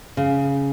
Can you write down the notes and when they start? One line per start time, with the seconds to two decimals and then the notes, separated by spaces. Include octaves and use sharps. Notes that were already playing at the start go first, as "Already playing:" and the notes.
0.17 C#3